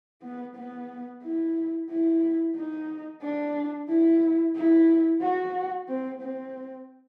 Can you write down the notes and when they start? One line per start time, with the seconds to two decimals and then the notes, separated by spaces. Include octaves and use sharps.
0.23 B3
0.56 B3
1.23 E4
1.90 E4
2.56 D#4
3.22 D4
3.89 E4
4.56 E4
5.21 F#4
5.89 C4
6.22 C4